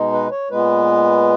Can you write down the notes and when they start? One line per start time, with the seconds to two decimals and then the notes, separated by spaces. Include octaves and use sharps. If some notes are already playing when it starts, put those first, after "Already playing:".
Already playing: B2 G#3 D#4
0.12 B4
0.32 C#5
0.51 A#2 G#3 B3 B4